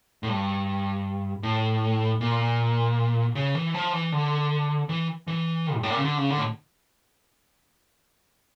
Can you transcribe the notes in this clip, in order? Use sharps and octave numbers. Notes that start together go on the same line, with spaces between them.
A2
G2
A2
A#2
C#3
E3
F3
E3
D3
E3
E3
G2
A2
A#2
C#3
D3
C#3
D3
A2